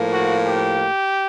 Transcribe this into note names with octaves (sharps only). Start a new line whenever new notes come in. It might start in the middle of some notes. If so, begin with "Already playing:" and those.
Already playing: A2 F3 A#3
F#4
G4